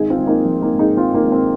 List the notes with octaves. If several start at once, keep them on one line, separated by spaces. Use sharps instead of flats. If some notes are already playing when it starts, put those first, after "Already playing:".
Already playing: G#1 D#4 G#4
C4 F4
G#1
A#3 D#4
F3
A#3 D#4
G#2
D#4 G#4
G#1 C4 F4
A#3 D#4
G#1
C4